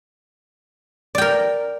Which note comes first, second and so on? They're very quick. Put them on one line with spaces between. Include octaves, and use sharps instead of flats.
D5 G5 A#4